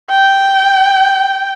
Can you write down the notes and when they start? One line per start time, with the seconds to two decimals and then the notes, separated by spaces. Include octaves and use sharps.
0.10 G5